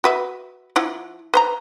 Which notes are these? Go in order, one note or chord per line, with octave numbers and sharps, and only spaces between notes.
F#4 B4 E5
F3 E4 F#5
B4 C5 A#5